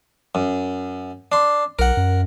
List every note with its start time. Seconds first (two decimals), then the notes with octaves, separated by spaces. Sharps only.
0.35 F#2
1.32 D4 C6
1.79 B1 A#4 F#5
1.97 F#2